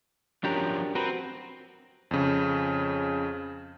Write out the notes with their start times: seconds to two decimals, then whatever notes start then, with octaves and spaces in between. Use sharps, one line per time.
0.44 F3 F#3 C#4 D4 G4 A#4
0.95 C4 F#4 A#4 B4
2.11 F2 C#3